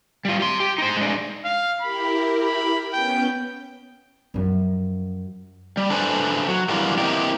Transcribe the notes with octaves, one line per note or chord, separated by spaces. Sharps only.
G3 F4
G4 C6
G4
D#4 C5
G#3 D4
F5
E4 G4 A#4 B5
B5
B3 C#4 G5 G6
F#2 F3
G3
D4 A4 B4 C5 G#5
F#3
D3 E3 F#3 G3 F4 A#4
A#3 C4 D#4 E4 G4